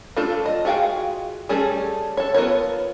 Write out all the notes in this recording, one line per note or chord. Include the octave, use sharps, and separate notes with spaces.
A3 D4 F4 A4
D#5
F4 F#4 G#4 F5 G5
G3 A3 C#4 G#4 A4
A4 C#5
B3 F4 A#4 C#5